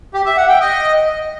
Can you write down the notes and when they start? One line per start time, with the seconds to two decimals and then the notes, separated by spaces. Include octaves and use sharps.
0.14 G4
0.25 E5
0.37 F#5
0.49 G5
0.60 D#5